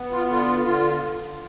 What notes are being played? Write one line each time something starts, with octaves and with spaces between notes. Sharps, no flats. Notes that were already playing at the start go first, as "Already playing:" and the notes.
Already playing: B3
F4
D3 F4
D3 F4